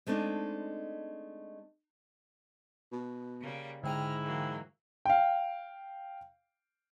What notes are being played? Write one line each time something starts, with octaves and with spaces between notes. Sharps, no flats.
G#3 A3 C4 D4 D#4
B2
C#3 G3 A#3
G#2 D3 E4 G5 A#5 F6 D#7
E3 F#3 A#3
F5 G5